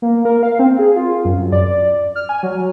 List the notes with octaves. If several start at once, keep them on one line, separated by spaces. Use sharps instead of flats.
A#3
A#4
F5
C4
G#4
F4
F#2
D5
F6
G#5
F#3